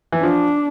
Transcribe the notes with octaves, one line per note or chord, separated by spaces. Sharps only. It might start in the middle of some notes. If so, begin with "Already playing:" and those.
E3
F3 D4